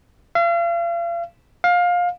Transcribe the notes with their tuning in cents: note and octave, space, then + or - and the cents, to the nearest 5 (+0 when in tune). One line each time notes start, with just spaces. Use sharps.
F5 -40
F5 +20